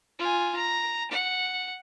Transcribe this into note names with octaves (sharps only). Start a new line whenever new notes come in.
F4 G#5
A#5
F#5